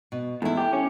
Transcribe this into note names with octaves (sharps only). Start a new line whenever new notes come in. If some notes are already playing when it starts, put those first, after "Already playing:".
B2
E2 A3 E4
G4
C#4